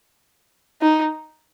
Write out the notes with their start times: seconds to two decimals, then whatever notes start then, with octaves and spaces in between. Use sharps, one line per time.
0.82 D#4